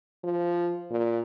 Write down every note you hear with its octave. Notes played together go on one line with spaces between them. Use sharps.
F3
A#2